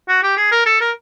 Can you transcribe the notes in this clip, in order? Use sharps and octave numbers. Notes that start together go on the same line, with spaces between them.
F#4
G4
G#4
A#4
A4
A#4